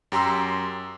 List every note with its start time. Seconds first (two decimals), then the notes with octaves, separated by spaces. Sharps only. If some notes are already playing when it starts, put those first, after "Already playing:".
0.12 F#2 G4 A#5 C6 E6